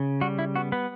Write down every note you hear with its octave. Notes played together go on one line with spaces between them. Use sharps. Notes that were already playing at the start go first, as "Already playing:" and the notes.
Already playing: C#3
G3 F#4
E4
B3 F#4
B3 B4